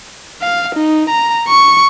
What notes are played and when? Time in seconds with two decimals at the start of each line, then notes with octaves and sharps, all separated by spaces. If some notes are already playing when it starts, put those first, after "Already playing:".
0.42 F5
0.75 D#4
1.10 A#5
1.48 C#6